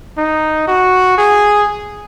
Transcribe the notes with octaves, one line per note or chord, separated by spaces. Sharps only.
D#4
F#4
G#4